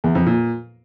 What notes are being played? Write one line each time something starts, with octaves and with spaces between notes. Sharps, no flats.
E2
F2
A#2